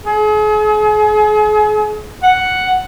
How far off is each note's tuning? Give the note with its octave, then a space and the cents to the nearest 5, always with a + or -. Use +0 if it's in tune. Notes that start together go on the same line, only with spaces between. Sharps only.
G#4 +40
F#5 +0